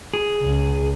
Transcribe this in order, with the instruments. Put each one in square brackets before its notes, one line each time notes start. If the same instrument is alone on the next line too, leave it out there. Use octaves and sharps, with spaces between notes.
[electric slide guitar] G#4
[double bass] C#2